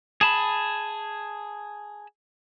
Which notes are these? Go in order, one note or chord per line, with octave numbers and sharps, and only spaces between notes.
G#4 A5 B5